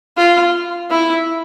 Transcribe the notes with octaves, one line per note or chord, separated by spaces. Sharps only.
F4
E4